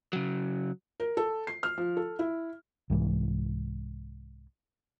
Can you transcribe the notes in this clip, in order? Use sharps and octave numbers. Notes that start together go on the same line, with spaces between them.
C#3 F#3
A#4
A4
C7
F6
F3
A4
E4
C2 G#2 E3